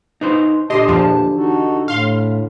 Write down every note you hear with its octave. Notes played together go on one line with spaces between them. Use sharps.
D#4 B4 C5
A#2 D3 G4 D#5 A5 C6
E2 F3
D#4 F#4 A4
A2 F5 C6